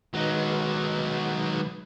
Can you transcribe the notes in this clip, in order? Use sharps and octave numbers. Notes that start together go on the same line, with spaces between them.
D#3 F#3 G#3 D#4 B4